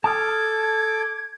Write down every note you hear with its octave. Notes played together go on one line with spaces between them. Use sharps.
A4 A5 D6 D#6 F6 G#6